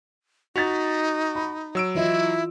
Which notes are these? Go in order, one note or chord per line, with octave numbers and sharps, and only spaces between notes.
D#4 F#4 A6 B6 F7
B5
F#3 E6 D7
E3 E4 F4 D#5